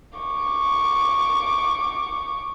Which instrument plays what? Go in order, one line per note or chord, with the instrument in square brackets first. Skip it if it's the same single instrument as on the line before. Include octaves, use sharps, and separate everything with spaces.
[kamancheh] C#6 D6